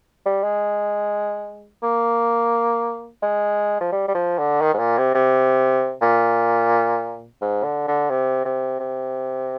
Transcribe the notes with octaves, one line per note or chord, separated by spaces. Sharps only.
G3
G#3
A#3
G#3
F3
G3
G3
F3
D3
D#3
G#2
A#2
C3
C3
A#2
G#2
D3
D3
C3
C3
C3